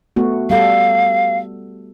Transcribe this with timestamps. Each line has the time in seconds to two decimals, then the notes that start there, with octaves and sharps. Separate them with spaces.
0.16 A3 B3 F#4
0.50 G3 A4 F5